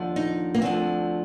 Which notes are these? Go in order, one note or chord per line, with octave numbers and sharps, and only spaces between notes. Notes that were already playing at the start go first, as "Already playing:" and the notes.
Already playing: D#2 D3 F3
D#4
A#3
D2 D3 F3 C4